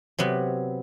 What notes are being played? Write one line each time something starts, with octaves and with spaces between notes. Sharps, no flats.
C3 F#3 B3